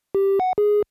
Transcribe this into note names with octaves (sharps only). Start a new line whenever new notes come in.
G4
F#5
G#4